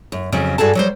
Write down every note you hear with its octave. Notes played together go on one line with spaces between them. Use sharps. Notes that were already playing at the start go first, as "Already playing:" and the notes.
F#2
F2 C#3 F#3
G2 F#4 G#4 A4 A5
F#3 G3 C5